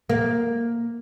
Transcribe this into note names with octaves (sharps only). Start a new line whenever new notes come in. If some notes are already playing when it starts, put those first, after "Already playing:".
A#3